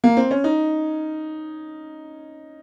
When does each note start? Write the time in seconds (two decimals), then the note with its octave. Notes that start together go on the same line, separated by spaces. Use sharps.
0.04 A#3
0.17 C4
0.31 C#4
0.44 D#4